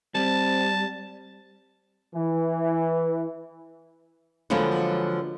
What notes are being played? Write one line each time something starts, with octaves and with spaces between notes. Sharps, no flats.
G3 C4 A5
E3
D3 F3 F#3 G#3 A#3 B3